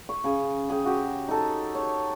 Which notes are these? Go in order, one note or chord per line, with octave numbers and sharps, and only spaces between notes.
C#6
C#3 G#4
G#4 G5
F#4 G4
D#4 A4
C#5